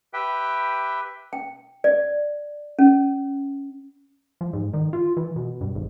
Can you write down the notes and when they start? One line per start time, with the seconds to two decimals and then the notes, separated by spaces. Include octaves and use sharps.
0.13 G4 B4 E5 G5
1.33 G5
1.84 D5
2.79 C#4
4.41 F3
4.53 G#2
4.74 D#3
4.93 F4
5.17 E3
5.36 B2
5.61 G2
5.75 G#1